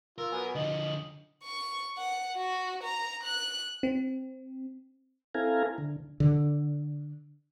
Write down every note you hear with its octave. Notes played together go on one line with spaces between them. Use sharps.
F4 A#4 E6
F#3 B3 G#5
D3 F3 D#5 F#7
C#6
F#5
F#4
A#5
F#6
C4
C4 E4 A4 F5 G#5 A#5
D3
D3